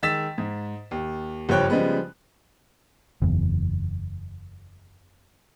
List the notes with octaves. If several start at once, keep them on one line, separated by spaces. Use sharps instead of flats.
D#3 G#3 E6 A6 B6 E7
G#2
D#2
F#1 G2 F3 C#5 G5 F#6
C#3 F3 G3 G#3 B3
F#1 E2